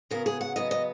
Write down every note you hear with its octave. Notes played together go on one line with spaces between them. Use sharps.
C#3 F#3 B3 A#4
G#4
F#5
C#3 F#3 B3 D#5
D#5